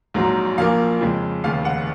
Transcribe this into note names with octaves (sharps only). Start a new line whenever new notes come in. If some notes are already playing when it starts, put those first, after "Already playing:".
A#1 G#2 F#3
A#1 A#2 F3 A#3 F5
F2 C#3 G#3
F1 D#2 C#3 F5
F#5